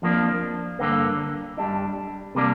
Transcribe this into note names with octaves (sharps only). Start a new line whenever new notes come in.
F2 F3 A#3 D4
G2 D3 A#3
G2 G3 D4
C3 G3 A#3 D4